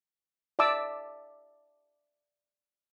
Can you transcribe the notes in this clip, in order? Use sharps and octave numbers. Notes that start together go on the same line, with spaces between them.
D5 E5 A5 D6 E6